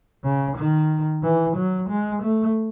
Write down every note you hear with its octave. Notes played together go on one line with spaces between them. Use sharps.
C#3
D#3
E3
F#3
G#3
A3